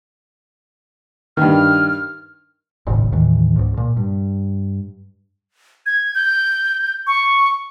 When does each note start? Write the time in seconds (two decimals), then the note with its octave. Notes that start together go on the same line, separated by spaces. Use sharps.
1.37 G2 D#3 F6
2.87 D#1 G#1 A2 C#3
3.12 D#2 A2 D#3 E3
3.56 C#2 G#2
3.77 A#2
3.97 G2
5.86 G#6
6.15 G6
7.07 C#6